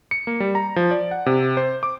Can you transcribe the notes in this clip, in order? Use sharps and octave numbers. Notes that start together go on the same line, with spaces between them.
C#7
A#3
G3
A#5
F3
D5
F#5
C3
C5
D6